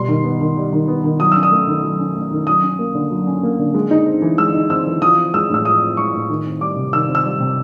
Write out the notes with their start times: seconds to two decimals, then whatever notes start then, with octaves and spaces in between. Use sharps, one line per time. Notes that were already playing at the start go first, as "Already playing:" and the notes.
Already playing: B2 G3 C6
0.08 D#3
0.24 B3
0.41 D#3
0.57 G3
0.72 D#3
0.88 B3
1.04 D#3
1.20 F#3 D#6
1.32 C#4 E6
1.43 D#6
1.51 A3
1.67 D#3
1.83 F#3
2.00 C#4
2.15 A3
2.31 D#3
2.47 F#3 D#6
2.63 C#4
2.79 A#3
2.95 D3
3.11 F#3
3.27 C#4
3.43 A#3
3.59 D3
3.74 G#3
3.91 D#4
4.06 C4
4.22 E3
4.38 G#3 E6
4.54 D#4
4.70 C4 E6
4.87 E3
5.02 F3 D#6
5.17 C4
5.34 G#3 E6
5.50 A2 E6
5.65 F3 D#6
5.81 C4
5.97 G#3 C#6
6.14 A2
6.29 D#3
6.46 C4
6.61 G3 D6
6.77 C3
6.93 D#3 E6
7.09 C4
7.15 E6
7.25 G3
7.40 C3